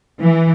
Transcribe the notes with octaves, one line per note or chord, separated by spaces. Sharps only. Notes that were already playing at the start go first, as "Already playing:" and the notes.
E3